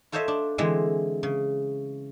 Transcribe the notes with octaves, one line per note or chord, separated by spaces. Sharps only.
F4 A4 C5 C#5 D#5 E5
D4
D3 E3 G#3 C4
C#3